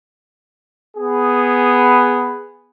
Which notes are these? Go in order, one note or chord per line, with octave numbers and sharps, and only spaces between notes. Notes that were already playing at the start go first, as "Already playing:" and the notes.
B3 G#4